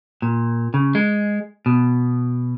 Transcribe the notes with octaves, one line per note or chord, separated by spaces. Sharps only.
A#2
C#3
G#3
B2